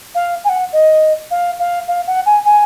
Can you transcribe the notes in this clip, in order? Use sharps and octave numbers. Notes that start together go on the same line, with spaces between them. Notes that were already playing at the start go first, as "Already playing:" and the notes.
F5
G#5
F#5
D#5
F5
F5
F5
F#5
G#5
G#5